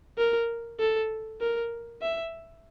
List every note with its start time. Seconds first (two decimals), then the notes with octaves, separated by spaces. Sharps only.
0.18 A#4
0.80 A4
1.40 A#4
2.02 E5